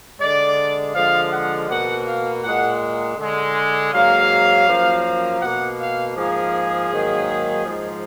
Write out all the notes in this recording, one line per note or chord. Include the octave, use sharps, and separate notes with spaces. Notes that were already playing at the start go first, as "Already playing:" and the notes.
D3 G#3 D5
D3 F3 G#3 F5
F#5
B2 A#3 F#5
F5
A#2 G#3 F#5
D3 G#3
G#2 F#3 A#3 F5
F#2 F3 A#3
B2 A#3 F#5
F5
G#2 F3 A#3 G#4
G#2 D#3 F#3 A#3
G#2 F3 G#3